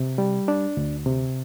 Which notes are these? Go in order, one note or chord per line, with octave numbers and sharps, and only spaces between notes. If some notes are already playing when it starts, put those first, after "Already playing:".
Already playing: C3
G3
D4
D2
C3